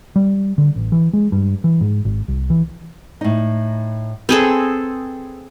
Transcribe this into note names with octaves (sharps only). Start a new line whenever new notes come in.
G3
D3
A1
E3
G#3
G2
E3
G#2
G#1
C2
E3
A2 D#4
C4 G#4 A4 B4